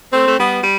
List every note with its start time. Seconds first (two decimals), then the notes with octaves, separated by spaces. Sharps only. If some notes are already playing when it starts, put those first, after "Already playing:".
0.13 A3 C4
0.28 A3
0.38 G3 B3
0.63 G3